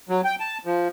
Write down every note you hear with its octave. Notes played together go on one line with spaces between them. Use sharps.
F#3
G5
A5
F3